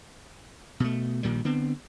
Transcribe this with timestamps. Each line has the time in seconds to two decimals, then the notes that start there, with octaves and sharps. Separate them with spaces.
0.80 B2 A3
1.23 A#1 A#2 D#3 G3
1.45 D3 B3 C4